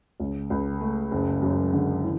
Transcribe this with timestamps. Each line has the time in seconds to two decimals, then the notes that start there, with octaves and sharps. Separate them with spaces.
0.20 C#2
0.50 C#2
0.81 A3
1.11 F#1
1.42 F#2
1.73 D3
2.04 E3